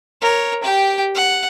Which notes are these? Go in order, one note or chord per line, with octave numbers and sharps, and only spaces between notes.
A#4 C#5
G4 G5
F#5